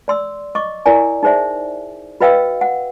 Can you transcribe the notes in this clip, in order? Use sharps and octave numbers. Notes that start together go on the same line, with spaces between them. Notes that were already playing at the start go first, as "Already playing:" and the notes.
D5 C6 E6
D#5 C#6 D6
E4 A#4 D5 G#5
D#4 G#4 C5 D5 E5
F#4 B4 D#5 F5 G5 E6
F#5